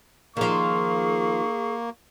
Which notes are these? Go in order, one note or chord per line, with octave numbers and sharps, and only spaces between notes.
D#3 F3 A#3 G#4 C#6